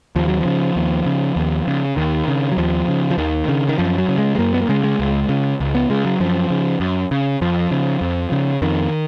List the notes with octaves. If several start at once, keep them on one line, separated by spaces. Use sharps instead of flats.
D#2 F3
F#3
C#3 F3
D#2
C#3
D#2
C#3
D#2 D#3
C#3
F#3
D#2 F3
C#3
F3
D#2 D#3
C#3
D#3
F#2 F3
F#3
C#3
G#3
G#3
F#2 A#3
B3
A#3
C#3 G#3
G#3
C#2
C#3
C#2
B3
C#3 G#3
F#3
F#2 F3
C#3
F#2
C#3
F2 F3
C#3
F2
C#3
F2 D#3